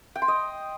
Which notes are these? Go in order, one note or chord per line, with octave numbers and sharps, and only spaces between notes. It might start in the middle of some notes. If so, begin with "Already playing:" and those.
G5
C6
D#5